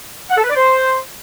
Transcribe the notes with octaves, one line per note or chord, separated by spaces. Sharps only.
F#5
A4
B4
D5
C5